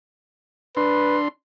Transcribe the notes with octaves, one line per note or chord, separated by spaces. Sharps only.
D4 B4 C6